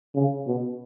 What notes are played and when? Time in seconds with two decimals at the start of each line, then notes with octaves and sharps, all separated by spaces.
0.14 C#3
0.47 B2